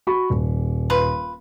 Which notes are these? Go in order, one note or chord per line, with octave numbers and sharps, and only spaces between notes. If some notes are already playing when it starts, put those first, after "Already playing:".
F#4 B5 C#6
D#1
F4 B4